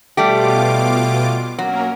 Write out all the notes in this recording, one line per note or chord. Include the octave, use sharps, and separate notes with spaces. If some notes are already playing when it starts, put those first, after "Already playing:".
B2 G3 A3 F4 G4 D6
F#3 A#3 C#4 A#4